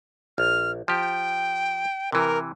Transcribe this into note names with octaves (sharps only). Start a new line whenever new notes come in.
A#1 F6
F3 G4 G5
C3 E3 A#4